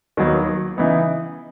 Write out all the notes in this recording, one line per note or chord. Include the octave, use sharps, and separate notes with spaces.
D#2 D#3 F#3 B3
C#3 E3 B3 D#4